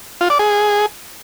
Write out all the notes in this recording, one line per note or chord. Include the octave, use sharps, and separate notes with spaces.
F4
D5
G#4